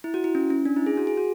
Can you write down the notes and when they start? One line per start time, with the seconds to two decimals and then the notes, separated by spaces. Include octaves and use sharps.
0.04 E4
0.14 F#4
0.24 E4
0.35 C#4
0.50 C#4
0.65 D4
0.76 E4
0.86 G#4
0.97 F#4
1.07 G#4
1.17 F#4